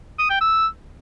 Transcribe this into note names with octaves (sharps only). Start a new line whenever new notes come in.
D#6
G5
E6